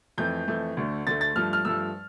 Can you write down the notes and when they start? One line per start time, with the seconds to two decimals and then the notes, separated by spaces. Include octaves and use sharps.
0.18 F2 E3 A3 G6
0.48 F2 E3 A3
0.77 D2 D3 A3
1.07 D2 D3 A3 A6
1.21 A6
1.36 G2 F3 A3 F6
1.53 F6
1.65 G2 F3 A3 E6